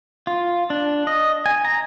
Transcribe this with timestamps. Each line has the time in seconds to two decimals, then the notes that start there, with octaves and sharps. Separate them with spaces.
0.27 F4
0.70 D4
1.07 D#5
1.46 G#5
1.65 A#5